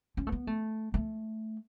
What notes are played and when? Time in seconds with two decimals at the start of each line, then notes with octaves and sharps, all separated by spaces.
0.17 C#4
0.27 A3
0.32 B3
0.47 A3
0.94 A3